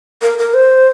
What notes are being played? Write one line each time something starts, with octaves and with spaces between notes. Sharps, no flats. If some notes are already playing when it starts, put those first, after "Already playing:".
A#4
A#4
C5